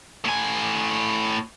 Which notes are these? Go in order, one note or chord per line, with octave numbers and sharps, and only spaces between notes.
A2 G#5